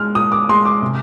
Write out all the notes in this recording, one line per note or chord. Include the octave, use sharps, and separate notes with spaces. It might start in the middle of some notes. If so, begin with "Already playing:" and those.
Already playing: G#3 F6
A#2 D#6
D6
G#3 C6
D6
C3